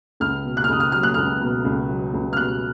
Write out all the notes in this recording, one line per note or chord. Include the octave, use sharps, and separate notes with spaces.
C#2 F6
B2
F#6
F6
C#2 D#6
F6
F#3 F6
F#6
C#2 F6
B2
C#2
F#3
C#2
F6
B2 F#6